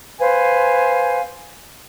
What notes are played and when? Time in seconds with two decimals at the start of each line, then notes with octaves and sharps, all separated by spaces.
0.19 B4 C5 F5 G#5